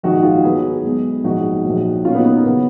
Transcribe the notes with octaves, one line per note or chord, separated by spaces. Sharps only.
A#1 G#2 D#3 D#4 F#4
F4 G#4
B1 B2 F#3 G#4 B4
B1 B2 G#3
A#1 G#2 F#3 D#4 F#4
A#1 A#2 F#3
B1 A#2 F#3 C#4 F4
B3 D#4
B3
A#3
C#3 F#3 B3